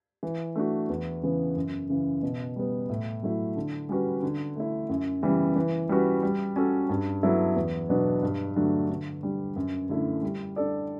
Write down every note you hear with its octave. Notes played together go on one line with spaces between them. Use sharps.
E3
A3 D4 F#4
E2
C#3 E3 B3
F#2
C#3 E3
B2
G3 B3
A2
F#3 A3 E4
D3
G3 C#4 F#4 B4
D3
A3 E4
F#2
C#3 E3 G3 B3
E3
G3 C#4 F#4 B4
G3
C#4 F#4 A4
G2
F#3 B3 E4 A4
E2
B2 F#3 B3 D4
G2
D3 F#3 A3 D4
D3
G3 D4
F#2
D3 A3 E4 A4
G3
D4 A4 D5